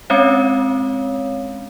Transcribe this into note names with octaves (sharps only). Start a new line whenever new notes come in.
G#3 C4 C#4 C#5 F5